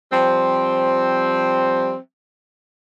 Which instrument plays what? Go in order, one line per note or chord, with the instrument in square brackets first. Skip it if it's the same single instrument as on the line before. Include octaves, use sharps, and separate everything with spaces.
[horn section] F3 G3 C4